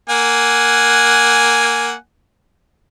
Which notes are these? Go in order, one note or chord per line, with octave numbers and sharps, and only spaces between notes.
A#3 F#5 G#5